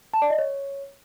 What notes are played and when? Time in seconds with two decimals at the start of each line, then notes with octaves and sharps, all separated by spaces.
0.14 A5
0.22 D5
0.30 D#5
0.39 C#5